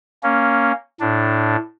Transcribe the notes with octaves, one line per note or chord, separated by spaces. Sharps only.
A#3 C#4
A2 D4